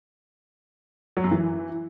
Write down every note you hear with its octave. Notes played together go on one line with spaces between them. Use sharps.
F#3
F#2
E3